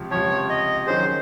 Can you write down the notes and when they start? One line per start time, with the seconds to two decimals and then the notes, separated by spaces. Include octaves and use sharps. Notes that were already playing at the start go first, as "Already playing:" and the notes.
Already playing: C#2 C3 F3
0.11 C#2 C3 F3 C#5
0.50 D#5
0.86 D#3 F#3 C#4 G#4 C5